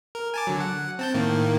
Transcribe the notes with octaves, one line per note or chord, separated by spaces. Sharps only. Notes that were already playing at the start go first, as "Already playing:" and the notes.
A#4
G#5 A5 D6
D3 F#3
F#5
C4 A5 G6
A2 D#3 A#3